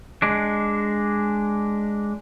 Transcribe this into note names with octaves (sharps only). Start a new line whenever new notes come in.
G#3 D4